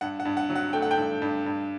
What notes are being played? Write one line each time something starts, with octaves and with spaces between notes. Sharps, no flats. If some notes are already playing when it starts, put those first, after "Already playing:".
G2 F#5
F#5
G2
F#5
F#3
F#5
A3 G5
F#5
G5
G2
G2
G2